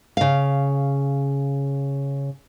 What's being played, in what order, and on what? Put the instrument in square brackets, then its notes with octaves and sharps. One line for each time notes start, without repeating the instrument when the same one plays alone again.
[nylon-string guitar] C#3 F5